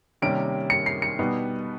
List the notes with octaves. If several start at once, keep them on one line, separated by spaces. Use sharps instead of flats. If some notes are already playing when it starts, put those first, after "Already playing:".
C3 D#3 G3 A#3 C#4 D7
C#7
C7
C#7
B2 G3 B3 D#4